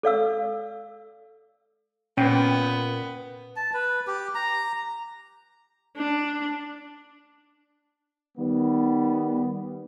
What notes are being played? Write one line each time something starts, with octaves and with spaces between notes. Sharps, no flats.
A4 D5 F5 E6
A#2 B3 C#4 G5
A5
B4
G4
A#5
D4
D#3 G3 B3